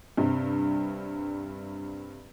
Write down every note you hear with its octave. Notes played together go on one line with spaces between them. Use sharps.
G2 C3